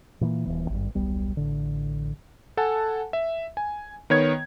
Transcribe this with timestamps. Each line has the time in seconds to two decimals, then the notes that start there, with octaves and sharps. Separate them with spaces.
0.21 A#2 E3 G#3 A#3
0.44 D#1 A#1 E3 B3
0.70 G#1 G2
0.95 D#1 B1 G3 B3
1.37 A1 D3
2.57 A4 F#5 G#5 A5
3.13 E5
3.57 G#5
4.10 D#3 B3 C#5 G#6